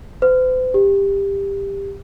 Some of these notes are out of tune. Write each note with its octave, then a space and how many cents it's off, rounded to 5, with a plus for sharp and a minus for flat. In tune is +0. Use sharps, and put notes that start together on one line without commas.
C5 -45
G4 +15